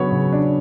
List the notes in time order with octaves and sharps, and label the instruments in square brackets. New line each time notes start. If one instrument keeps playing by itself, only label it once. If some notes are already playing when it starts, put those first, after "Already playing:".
Already playing: [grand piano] C#3 F#3 B3 C#5
C#3
D4